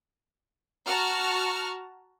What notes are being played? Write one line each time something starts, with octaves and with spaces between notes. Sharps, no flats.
F#4 A5 A#5 F6